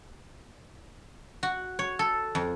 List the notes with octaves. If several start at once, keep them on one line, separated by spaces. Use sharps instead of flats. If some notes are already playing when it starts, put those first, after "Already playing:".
F#4
C#5
A4
F2